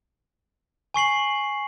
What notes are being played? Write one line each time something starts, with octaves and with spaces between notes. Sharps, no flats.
G#5 C#6 C7 F#7